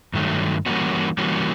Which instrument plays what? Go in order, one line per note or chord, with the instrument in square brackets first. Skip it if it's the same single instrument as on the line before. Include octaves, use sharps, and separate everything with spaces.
[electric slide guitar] G2 D#3 F#3 A3
E3 G3 A#3 C#4 F#4
E3 G3 A#3 C#4 F#4